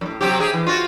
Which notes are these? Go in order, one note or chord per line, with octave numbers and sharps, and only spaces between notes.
F#2 A2
C3 F#3 G4
G4 G#4
E3
F4 F#4